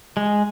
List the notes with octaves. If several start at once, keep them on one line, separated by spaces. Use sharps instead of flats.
G#3